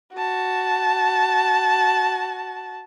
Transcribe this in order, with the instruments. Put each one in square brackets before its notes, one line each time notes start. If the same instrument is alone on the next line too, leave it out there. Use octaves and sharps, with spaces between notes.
[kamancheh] F#4 A5